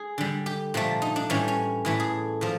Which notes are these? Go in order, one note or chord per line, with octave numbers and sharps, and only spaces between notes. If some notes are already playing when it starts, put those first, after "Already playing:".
Already playing: G#4
D3 G3
G4
A#2 F3 A3
D#4
D4
A2 E3 G3 C#4
C#4
A2 E3 A3
G#4
A#2 F3